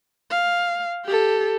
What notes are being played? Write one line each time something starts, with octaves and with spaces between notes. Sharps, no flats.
F5
G4 A4